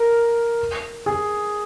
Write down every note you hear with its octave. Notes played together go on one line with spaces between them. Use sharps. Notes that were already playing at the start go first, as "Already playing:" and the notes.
Already playing: A#4
G#4